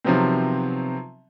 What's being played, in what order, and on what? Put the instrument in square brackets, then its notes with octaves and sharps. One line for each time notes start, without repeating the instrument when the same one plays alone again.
[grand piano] C3 D#3 F3 F#3 B3 C4